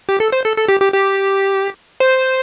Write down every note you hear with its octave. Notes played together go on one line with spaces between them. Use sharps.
G4
A4
C5
A4
A4
G4
G4
G4
C5